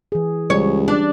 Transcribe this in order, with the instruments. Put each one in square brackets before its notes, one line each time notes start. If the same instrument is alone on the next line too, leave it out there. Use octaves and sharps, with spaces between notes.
[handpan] E3 G#4
[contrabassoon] C#2 [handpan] G3 C#4 [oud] C#5
[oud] D4